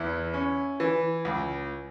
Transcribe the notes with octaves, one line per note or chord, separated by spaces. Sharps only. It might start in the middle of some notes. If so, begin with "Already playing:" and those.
Already playing: E2 E4
C#4
E3
C#2